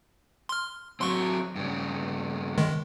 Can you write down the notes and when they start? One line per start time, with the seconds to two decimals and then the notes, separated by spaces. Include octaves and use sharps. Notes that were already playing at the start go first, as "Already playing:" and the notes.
0.49 C6 F6
1.00 F#3 C4 C6 C#6
1.56 G2 C#3
2.58 D#3 G#3